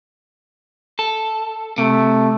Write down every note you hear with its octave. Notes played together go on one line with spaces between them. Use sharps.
A4
C3 A3